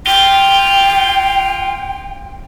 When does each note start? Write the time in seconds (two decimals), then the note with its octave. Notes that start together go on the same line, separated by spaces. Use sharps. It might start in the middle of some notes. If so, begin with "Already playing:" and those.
0.07 F4 G5